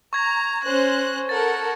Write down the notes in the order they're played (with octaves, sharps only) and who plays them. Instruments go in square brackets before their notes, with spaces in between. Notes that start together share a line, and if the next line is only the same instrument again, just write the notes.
[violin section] A#5 [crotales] C#6 G#6 A#6
[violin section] C#4 C5 F#6
[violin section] A4 A#4 F#5 [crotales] A6